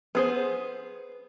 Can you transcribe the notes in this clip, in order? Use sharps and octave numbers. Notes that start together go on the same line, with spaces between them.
B3 G#4 C5